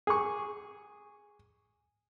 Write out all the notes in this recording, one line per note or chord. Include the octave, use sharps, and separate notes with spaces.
G#4 C#6